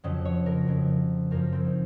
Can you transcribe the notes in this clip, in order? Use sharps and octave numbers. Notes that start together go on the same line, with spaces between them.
F2 C#3 F#3 D#5
C#5
A#4
F2 C#3 F#3
F#2 F3 A#4
C4
D#4